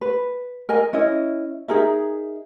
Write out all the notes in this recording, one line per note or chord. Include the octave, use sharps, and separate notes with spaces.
B4
A#4 D#5 G#5
C#4 E4 D#5
D#4 G#4 A#4 E5